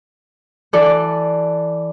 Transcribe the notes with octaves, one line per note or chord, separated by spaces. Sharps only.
E3 A4 D5